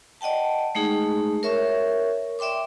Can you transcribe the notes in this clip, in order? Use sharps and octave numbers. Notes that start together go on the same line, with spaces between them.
D5 D#5 F#5 G5 A5
G#3 A3 D#4 G#4
A#4 C#5 E5 C#6
D5 E5 G5 C6 D6